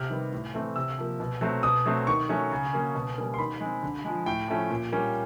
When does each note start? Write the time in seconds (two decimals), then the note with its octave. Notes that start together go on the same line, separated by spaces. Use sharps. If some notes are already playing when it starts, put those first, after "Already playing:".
Already playing: C3 F6
0.10 D#3 G3 B3
0.32 A2
0.54 E3 A3 C4
0.76 C3 E6
0.98 F3 A#3
1.20 B2
1.41 F#3 A3 C4
1.63 B2 D#6
1.86 F#3 A3 C4
2.07 D#3 C#6
2.29 F#3 A3 C#4
2.52 C#3
2.73 F#3 A#3 C#4
2.95 B2
3.17 G3 A#3 C#4
3.34 C6
3.39 D#3 B5
3.61 G#3 C4
3.83 D3
4.04 F3 G#3
4.26 A2 G5
4.48 F3 A3 C#4
4.70 A#2
4.92 G3 A#3 C#4